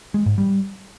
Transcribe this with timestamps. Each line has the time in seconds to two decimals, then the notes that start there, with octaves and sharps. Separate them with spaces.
0.14 G#3
0.26 G#2
0.38 G3